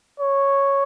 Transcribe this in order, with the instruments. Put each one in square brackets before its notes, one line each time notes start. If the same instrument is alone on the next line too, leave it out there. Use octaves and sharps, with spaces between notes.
[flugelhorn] C#5